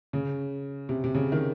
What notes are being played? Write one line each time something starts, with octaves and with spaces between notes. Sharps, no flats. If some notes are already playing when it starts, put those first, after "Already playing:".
C#3
C3
C3
C#3
D#3